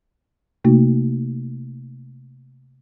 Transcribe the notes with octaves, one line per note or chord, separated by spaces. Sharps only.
C3 A3 A#3 D#4 F#4